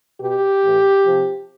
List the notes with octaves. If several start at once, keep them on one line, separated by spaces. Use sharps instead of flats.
B2 G4
A2 E3
C3 F3